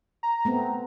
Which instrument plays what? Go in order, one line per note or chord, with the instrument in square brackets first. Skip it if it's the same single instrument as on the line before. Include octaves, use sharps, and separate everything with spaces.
[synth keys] A#5
[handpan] A3 B3 C4